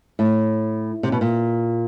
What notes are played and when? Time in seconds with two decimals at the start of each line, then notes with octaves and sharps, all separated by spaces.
0.19 A2
1.03 C3
1.12 B2
1.21 A#2